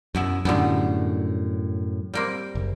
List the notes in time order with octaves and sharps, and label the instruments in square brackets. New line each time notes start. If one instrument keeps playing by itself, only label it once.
[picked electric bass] F#2 [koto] B2 B3 E4
[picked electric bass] F#2 A2 [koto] D3 G3 B3
[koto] G3 A#3 C4
[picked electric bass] F#1